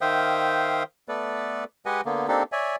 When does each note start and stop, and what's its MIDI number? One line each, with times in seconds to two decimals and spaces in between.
0.01 0.83 51
0.01 0.83 72
0.01 0.83 76
0.01 0.83 77
0.01 0.83 79
0.01 0.83 87
1.08 1.64 57
1.08 1.64 59
1.08 1.64 69
1.08 1.64 71
1.08 1.64 74
1.86 2.01 56
1.86 2.01 67
1.86 2.01 71
1.86 2.01 75
1.86 2.01 78
1.86 2.01 80
2.05 2.27 50
2.05 2.27 58
2.05 2.27 59
2.28 2.43 58
2.28 2.43 60
2.28 2.43 62
2.28 2.43 63
2.28 2.43 67
2.28 2.43 69
2.52 2.76 73
2.52 2.76 74
2.52 2.76 76
2.52 2.76 80